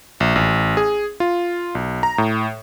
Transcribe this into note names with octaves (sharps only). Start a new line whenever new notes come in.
A#1
A1
G#4
F4
B1
A#5
A2